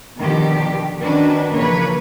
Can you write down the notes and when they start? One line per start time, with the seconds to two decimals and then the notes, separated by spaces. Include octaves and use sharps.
0.19 B2 D3 D#3 F3 G4
1.03 D#3 C#4 D4 F#4 B4
1.54 C#3 E3 F3 A#3 B4 C#5